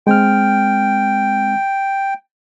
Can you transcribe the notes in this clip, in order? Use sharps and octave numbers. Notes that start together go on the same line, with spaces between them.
G#3 C4 G5 F6